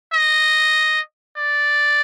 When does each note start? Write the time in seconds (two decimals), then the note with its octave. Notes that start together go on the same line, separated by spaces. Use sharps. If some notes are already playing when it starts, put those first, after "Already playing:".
0.14 D#5
1.37 D5